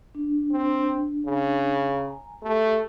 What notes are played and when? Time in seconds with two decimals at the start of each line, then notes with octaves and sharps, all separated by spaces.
0.15 D4
0.52 C4
1.27 C#3
1.95 G#5 A#5
2.43 A3 G4